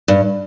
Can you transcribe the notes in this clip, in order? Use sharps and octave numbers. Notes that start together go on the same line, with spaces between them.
G2